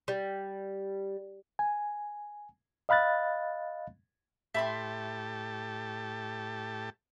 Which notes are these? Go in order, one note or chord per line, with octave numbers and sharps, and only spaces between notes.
G3
G#5
D#5 F5 B5 F#6 A6
A2 G4 E5 A5 B5 C6